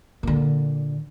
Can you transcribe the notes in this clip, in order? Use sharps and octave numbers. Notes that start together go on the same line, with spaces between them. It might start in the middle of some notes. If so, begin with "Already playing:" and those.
A#2 D3